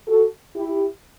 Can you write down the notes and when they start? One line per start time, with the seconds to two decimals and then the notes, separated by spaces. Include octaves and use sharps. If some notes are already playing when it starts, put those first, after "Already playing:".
0.08 F#4 A4
0.56 E4 G4